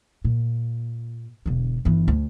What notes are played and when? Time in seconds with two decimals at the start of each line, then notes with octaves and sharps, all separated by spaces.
0.25 A#2
1.46 E1 D3
1.85 G1 E3
2.08 D2